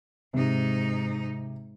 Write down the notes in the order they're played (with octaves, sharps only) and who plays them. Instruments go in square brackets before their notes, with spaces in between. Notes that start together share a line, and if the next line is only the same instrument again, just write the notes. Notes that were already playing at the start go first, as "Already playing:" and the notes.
[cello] G#2 D#4 [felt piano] C3